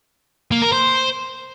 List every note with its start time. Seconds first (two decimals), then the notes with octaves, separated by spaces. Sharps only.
0.52 A#3
0.62 A#4
0.73 C5